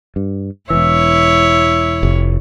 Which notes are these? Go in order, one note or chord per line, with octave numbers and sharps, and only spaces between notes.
G2
E1 B1 E3 E4 C#5 E5
F1